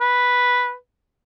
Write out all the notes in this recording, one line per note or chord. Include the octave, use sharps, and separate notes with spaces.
B4